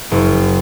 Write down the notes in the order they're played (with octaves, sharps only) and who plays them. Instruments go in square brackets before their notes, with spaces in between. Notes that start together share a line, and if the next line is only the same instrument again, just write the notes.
[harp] F#1